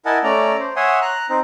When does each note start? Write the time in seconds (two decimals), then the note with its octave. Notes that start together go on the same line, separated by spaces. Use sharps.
0.06 E4 A#4 D#5 F#5 G#5 A5
0.24 A3 C#4 D5 A#5
0.60 C5
0.76 C#5 E5 F#5 G#5 C6 D#6
1.02 A#5 F#6
1.30 C4 D#4